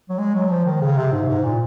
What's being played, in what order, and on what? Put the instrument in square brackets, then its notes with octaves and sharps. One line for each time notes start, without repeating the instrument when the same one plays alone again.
[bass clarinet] F#3
G#3
F#3
F3
D#3
C#3
C3
G#2
G#2
A#2